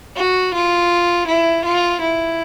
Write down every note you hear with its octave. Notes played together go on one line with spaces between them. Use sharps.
F#4
F4
E4
F4
E4